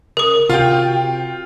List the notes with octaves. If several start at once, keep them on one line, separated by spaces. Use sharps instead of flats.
C#3 A#4 D#6
C3 F4 F#4 G5